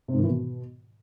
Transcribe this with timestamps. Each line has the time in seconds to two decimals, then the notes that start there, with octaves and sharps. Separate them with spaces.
0.08 C3
0.13 G#2
0.19 D#3
0.24 E3
0.29 B2